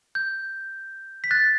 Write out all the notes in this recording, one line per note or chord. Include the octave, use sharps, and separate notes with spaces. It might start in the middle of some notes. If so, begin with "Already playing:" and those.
G6
B6
F#6 A6